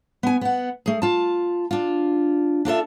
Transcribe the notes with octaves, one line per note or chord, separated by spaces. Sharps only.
B3 G#5
B3 F#5
A3 G#4
F4 A5
D4 F4
D4 F4 A4 E5